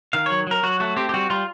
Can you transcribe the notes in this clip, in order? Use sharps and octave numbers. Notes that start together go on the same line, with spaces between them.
D#3 F5
F#3 C#5
F#3 A#4
F#3 F#4
A3 F#4
C4 G4
G4
G3 F#4
G3 F4